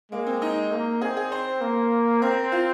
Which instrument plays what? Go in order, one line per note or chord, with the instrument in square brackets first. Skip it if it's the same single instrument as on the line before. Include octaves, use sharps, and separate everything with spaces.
[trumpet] G#3 [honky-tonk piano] A#3
[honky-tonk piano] C4
D#4
[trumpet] A#3
[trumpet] C4 [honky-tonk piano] G#4
[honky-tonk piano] G#4
C5
[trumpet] A#3
[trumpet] C4 [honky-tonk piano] A#4
[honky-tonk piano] F4